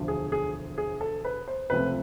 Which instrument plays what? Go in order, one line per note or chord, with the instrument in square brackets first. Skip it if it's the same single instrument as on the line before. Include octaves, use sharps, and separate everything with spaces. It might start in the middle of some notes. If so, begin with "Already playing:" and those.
Already playing: [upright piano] E1 D2 D3 F3
G#4
G#4
G#4
A4
B4
C5
C#2 C3 F3 A3 C4 B4